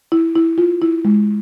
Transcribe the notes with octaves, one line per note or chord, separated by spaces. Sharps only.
E4
E4
F4
E4
G#3